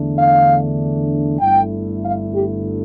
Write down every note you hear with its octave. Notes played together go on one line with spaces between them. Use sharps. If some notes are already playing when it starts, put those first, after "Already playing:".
Already playing: E2 D3 A3 D4
F5
G1 G2 D3 A3 E4 G5
F5
G4